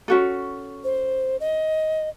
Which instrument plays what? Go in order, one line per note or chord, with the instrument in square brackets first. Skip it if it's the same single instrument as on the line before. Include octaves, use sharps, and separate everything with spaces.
[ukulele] C#4 F#4 A4
[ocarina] C5
D#5